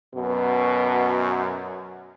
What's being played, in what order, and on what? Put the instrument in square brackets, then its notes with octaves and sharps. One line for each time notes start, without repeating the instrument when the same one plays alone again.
[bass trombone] F#2 [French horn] B2